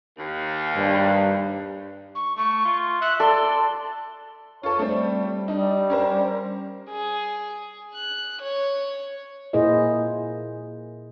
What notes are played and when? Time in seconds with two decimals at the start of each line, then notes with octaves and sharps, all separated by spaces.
0.17 D#2
0.77 G2
2.15 C#6
2.37 A3 C#6
2.65 F4
3.02 E5 F#6
3.20 A4 D5 C6
4.63 F4 A4 C#5
4.79 G3 A3 C4
5.48 G3 D4 D#4
5.90 C#4 A#4 C5
6.90 G#4
7.94 F#6
8.42 C#5
9.53 A#2 A#3 E4 G#4 C5 D#5